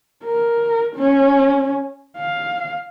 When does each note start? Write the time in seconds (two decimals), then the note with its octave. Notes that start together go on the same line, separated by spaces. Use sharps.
0.24 A#4
0.96 C#4
2.18 F5